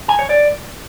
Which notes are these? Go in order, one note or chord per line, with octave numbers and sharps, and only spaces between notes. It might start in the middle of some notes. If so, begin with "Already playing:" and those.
G#5
C#5
D5